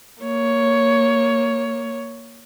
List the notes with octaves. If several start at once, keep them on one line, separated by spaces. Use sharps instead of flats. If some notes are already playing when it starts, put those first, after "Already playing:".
A#3 C#5